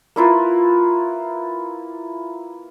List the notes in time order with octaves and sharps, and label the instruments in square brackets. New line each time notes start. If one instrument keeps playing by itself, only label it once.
[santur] A#3 E4 F4 B4